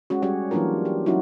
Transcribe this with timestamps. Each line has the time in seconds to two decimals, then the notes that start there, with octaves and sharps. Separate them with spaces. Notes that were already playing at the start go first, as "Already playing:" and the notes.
0.10 G#3 C#4 F#4
0.22 G3 C#4 F#4 G4 C#5
0.51 E3 F#3 A#3 D4 F4 A#4
0.85 G4
1.06 F#3 C#4 D#4 E4 F#4